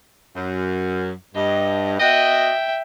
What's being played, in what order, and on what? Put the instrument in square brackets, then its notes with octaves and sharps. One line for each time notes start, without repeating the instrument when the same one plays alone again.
[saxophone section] F#2
[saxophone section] G2 [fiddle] D#5
[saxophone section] B3 F#4 D#5 [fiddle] E5 G5